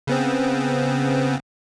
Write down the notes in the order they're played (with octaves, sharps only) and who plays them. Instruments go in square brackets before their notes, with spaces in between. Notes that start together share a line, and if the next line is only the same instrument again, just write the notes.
[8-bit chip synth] C#3 B3 C4